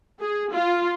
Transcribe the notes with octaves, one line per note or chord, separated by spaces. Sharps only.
G#4
F4